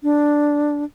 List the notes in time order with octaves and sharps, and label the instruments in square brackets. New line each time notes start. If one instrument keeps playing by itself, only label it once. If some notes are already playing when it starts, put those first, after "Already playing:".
[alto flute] D4